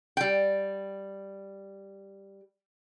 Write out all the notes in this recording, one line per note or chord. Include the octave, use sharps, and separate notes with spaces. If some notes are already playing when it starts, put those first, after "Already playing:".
G3 G5